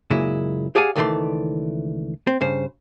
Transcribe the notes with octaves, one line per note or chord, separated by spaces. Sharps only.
F#2 A#2 C#3 G#3 E4
G4 G#4 D5 F5 F#5 G#5
C#2 D#3 E3 A3 D5 C6
C4
G2 C#3 C5